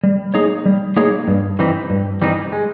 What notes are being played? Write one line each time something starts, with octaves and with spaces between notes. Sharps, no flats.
G3
A#3 D#4 G#4 C#5
G3
A#3 D#4 G#4 C#5
G2
E3 G3 C4 D#4
G2
E3 G3 C4 D#4
G#3